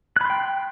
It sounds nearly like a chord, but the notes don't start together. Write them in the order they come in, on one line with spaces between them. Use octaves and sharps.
F#6 B5 C6 G5